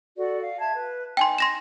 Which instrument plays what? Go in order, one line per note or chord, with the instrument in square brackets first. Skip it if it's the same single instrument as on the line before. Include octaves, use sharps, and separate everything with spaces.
[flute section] F#4 A4 D5
F5
E5 A5 G#6
B4
[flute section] D#4 [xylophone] G5 G#5 C6
[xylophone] C6 A#6 E7